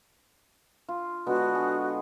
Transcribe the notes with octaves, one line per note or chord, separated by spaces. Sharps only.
F4
D3 G#3 B3 F#4
G#4